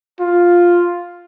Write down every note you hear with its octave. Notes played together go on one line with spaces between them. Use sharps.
F4